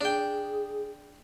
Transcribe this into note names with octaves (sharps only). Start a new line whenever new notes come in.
D4 G#4 G5